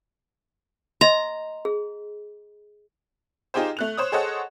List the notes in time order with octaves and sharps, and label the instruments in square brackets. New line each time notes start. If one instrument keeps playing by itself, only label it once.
[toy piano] D#5 C6 [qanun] A#5
[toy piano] G#4
[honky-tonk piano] D#4 F4 G4 G#4 C5
A3 F#6 F7
C5 C#5 D#6
G#4 A4 C5 C#5 D#5 F#5